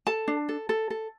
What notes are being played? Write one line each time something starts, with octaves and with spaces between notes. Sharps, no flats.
A4 A5
D4
A4
A4
A4